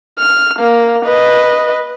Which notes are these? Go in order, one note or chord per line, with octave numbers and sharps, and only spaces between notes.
F6
A#3
B4 D#5